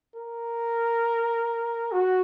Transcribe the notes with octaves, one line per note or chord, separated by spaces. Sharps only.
A#4
F#4